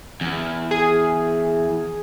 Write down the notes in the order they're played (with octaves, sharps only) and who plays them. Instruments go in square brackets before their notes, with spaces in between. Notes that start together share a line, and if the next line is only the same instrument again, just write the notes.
[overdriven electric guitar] E2
[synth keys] G#4